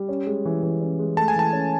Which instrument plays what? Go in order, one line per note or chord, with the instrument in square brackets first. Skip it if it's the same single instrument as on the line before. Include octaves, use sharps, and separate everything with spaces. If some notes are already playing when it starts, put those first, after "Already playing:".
Already playing: [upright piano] G3
C#4
G#3
E3
E3
C#4
G#3
[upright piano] A3 [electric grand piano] A5
[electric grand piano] G#5
[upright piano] E3 [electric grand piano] A5
[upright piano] C#4